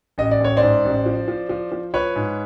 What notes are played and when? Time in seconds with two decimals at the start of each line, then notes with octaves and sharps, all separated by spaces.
0.18 A1 D#5
0.31 D5
0.40 A1 C#5
0.57 C5 D5
0.62 G#2
0.85 A1
1.06 F3
1.28 F3
1.49 F3
1.72 F3
1.94 F3 B4 C#5
2.16 G#2